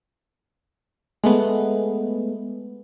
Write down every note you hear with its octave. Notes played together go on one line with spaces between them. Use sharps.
G#3 A3 B3